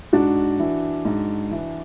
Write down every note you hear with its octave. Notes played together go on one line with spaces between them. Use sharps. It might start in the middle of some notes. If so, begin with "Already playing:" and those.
G#2 D4 F#4
E3
G#2
E3